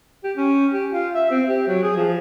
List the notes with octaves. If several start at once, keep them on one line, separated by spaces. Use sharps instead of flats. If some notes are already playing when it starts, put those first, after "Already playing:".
G4
C#4
G4
F4
E5
C4
G4
F#3
G#4
F3